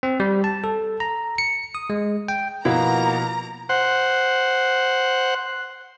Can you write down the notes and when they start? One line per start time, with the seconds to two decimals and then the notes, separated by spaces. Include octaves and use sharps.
0.03 C4
0.20 G3
0.44 A5
0.64 A4
1.00 A#5
1.38 C#7
1.75 D#6
1.90 G#3
2.28 G5
2.65 B2 F3 A#3 B3 E4 A#4 F5 A#5
3.69 C5 F#5